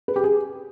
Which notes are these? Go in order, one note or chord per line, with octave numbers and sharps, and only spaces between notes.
B4
G4
G#4